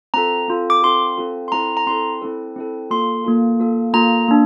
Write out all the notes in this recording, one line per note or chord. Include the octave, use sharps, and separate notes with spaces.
C4 F4 A4 A#5
C4 F4 A4
D6
C4 F4 A4 C6
C4 F4 A4
C6
C4 E4 A4 A#5
A#5
C4 E4 A4 C6
C4 E4 A4
C4 E4 A4
A#3 F4 A4 C6
A#3 F4 A4
A#3 F4 A4
A#3 F4 A4 A#5
A#3 D4